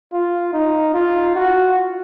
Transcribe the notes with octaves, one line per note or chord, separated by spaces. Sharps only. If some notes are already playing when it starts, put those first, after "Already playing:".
F4
D#4
F4
F#4